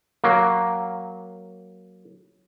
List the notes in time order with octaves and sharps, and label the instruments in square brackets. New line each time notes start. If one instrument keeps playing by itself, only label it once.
[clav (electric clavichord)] F#3 A#3